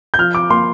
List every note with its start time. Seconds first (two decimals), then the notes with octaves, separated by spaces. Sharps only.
0.14 G6
0.18 F3 F6
0.35 D6
0.50 A#3 C6